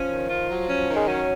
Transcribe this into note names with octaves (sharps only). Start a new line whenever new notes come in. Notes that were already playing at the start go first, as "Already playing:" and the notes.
Already playing: F3 C#4
D#3
F4
F#3
C#4
D#3
G#3
F#3 C#4